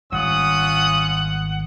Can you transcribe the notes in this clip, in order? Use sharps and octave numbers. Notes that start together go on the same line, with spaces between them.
G#1 G3 C#4 F4 F#5 D#6